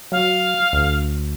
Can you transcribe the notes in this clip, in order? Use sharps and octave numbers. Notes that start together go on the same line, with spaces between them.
F#3 F5
D2